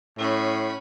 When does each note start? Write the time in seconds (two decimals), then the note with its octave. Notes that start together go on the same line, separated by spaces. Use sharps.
0.18 A2 C#4 B5